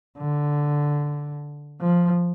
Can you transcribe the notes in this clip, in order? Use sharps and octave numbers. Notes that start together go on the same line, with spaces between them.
D3
F3